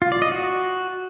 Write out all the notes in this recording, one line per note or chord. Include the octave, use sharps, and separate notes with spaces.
F4
D5
D#5
F#4